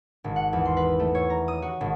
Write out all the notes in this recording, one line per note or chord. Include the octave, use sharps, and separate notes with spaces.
G#1
F#5
E2
C6
B4
A3
C#5
A#5
D#6
F#4
G#1